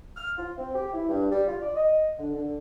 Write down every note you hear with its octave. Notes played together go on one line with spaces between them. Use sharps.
F6
F4
C4
G4
E4
G2
G3
F4
D5
D#5
D3
D3